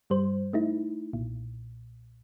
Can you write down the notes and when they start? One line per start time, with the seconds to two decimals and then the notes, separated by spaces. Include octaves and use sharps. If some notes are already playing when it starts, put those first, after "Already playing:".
0.10 G2 G3 C5
0.53 A3 D#4 E4
1.13 B1 A#2